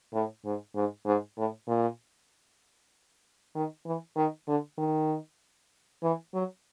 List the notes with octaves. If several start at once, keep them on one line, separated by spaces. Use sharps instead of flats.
A2
G#2
G#2
G#2
A2
A#2
D#3
E3
D#3
D3
D#3
E3
F#3